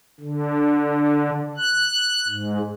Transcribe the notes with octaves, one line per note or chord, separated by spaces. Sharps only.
D3
F#6
G#2